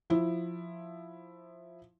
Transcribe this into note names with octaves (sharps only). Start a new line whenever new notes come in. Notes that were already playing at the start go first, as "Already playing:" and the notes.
F3 E4